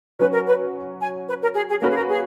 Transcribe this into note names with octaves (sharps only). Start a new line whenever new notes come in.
F#3 C#4 F#4 B4
A#4
B4
G#5
B4
A#4
G#4
G#4
A#3 C#4 F#4 A#4 B4
G#4
A#4
G#4